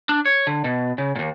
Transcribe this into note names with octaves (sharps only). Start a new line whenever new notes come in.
D4
C#5
D3
B2
C#3
D#2 A#2